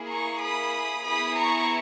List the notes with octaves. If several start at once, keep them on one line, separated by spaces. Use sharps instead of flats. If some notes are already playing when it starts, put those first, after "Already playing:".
Already playing: A#3 E4 G#4
A#5 C#6
B5 D#6
B3 E4 G#4 B5 D#6
A#5 C#6